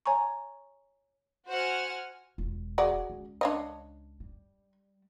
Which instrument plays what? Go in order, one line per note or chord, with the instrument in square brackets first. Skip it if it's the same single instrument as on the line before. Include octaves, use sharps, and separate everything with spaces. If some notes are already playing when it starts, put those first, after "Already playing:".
[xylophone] C#5 G#5 A#5 C#6
[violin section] F#4 C5 F#5 G#5 F6
[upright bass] E1 F4
[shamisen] F#4 G#4 D5
[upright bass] C#2
[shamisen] D4 C#5 D#5
[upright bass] G3